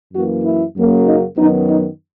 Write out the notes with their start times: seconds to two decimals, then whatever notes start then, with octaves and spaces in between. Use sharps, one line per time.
0.13 F#2 E3 A#3 F#4
0.44 E4
0.75 F#2 C#3 F#3 A#3
1.06 D#4
1.37 F#2 D#3 F#3 B3 D#4
1.68 D#4